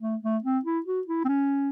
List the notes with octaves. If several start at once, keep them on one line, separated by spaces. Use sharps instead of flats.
A3
A3
C4
E4
F#4
E4
C4
C#4